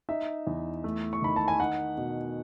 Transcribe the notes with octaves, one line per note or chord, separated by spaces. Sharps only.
D#4 E5
E2
A3
C#6
D#3 B5
A5
G#5
D#4 F#5
B2